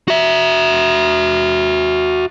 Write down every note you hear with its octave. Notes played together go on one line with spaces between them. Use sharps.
F#4 E5